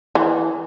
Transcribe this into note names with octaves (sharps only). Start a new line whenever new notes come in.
E3